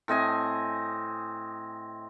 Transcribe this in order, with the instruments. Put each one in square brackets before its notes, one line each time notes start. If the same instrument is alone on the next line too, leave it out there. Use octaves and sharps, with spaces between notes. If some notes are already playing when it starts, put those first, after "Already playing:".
[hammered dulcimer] A2 C4 D#5 G#5